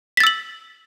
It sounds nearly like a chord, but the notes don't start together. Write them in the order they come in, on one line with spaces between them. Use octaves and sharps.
B6 A6 E6 F#7